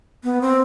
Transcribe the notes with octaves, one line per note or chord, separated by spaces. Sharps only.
B3
C4